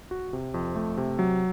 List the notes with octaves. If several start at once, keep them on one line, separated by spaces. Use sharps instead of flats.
F#4
C3
F2
A3
C3
F#3